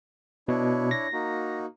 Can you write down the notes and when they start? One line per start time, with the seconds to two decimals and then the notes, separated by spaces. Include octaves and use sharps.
0.48 B2 D4 E4 C#5
0.91 A#6
1.13 A#3 D#4 F#4